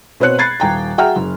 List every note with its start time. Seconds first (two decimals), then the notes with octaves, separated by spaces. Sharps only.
0.20 B2 C4 C#5 F#6 C#7
0.38 B5 G#6 A6 C7
0.60 D#1 G5 A#5
0.98 F#4 G#4 E5 G5 A#5 F6
1.16 F#1